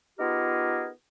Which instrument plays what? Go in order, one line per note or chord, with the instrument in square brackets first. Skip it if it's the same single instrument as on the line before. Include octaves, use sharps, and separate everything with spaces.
[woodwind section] B3 D#4 F4 G4 G#4 A#4